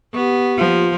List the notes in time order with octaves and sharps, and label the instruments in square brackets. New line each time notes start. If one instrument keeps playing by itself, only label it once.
[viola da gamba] B3 [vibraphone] G4 C#6
[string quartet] F3 [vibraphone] A#3 F4 G4